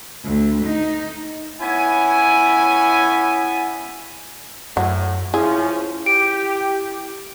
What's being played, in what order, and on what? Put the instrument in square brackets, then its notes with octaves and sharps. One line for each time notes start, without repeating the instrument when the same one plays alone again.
[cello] D2
D#4
[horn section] B3 C#4 E4 G#5
[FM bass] F#2 [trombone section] A2 [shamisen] F#3
[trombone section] F3 C#4 [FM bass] E4 [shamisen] G#4
[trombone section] G4 [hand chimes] D7